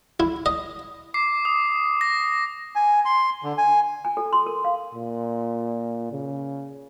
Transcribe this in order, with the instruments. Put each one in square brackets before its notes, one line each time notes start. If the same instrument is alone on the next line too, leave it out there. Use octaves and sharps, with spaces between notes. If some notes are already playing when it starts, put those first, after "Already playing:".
[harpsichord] E4
D#5
[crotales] D6 C7
D#6
A#6
[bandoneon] G#5
C6
D3
G#5
[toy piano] G#5
A4
C6
A#4
F5
[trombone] A#2
C#3